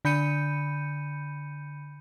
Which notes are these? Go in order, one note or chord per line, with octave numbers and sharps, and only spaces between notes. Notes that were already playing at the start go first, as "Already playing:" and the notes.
D3 B5 G6 C#7 D#7